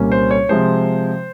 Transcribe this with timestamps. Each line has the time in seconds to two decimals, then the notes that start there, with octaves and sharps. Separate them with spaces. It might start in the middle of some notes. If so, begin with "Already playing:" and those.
Already playing: C2 A#2 G3 A#3 C#4
0.12 C5
0.31 C#5
0.49 C3 F3 G#3 C5